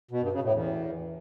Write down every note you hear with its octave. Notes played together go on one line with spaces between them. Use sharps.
B2
G2
C#3
A2
E2